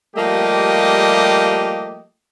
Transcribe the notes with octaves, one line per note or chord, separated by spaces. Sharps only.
F3 G3 A3 A#3 G4 D#5